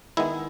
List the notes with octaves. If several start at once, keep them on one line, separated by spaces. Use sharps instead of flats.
D#3 G#3 B3 E4